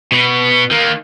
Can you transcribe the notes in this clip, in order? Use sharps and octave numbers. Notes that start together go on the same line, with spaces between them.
B2 B3
D#3 A#3